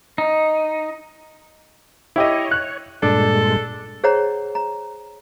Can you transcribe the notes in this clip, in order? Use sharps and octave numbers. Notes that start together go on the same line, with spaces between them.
D#4
E4 G4 C#5 D#5
F#6
G2 A#2 G#3 D4 A4
G#4 C5 C#5 F#5 A#5
A#5